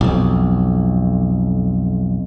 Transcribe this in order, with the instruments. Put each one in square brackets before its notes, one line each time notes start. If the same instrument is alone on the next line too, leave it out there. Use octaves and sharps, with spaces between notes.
[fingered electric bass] B1 F2